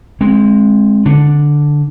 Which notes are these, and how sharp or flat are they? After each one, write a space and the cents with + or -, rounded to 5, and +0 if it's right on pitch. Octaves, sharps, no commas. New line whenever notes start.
G#3 +0 C4 +25
D3 +0 D4 +0